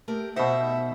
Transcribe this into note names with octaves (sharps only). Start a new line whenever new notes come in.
A3 G4 A#4
B2 D#4 C5 E5 F#5